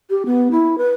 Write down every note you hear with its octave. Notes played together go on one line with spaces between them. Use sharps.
G4
B3
E4
B4